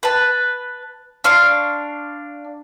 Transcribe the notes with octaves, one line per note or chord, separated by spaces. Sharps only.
B4 A5
D4 F5 C6 C#6